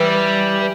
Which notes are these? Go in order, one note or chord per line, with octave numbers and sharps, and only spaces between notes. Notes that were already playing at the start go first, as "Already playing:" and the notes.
Already playing: E3 G3